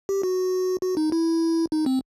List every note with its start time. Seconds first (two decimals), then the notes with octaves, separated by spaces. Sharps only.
0.09 G4
0.23 F#4
0.82 F#4
0.97 D#4
1.12 E4
1.72 D#4
1.86 C4